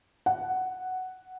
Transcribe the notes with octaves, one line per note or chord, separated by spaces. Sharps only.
F#5